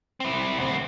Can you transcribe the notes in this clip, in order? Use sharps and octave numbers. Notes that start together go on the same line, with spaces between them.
C4 E4
D2 C4